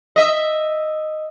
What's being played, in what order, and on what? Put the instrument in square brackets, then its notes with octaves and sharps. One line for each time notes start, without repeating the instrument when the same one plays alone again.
[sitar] D#5 E5